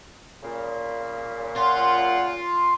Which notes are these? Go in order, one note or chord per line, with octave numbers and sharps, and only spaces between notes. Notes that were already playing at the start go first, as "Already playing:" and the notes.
A#2 C#3
F4 F#5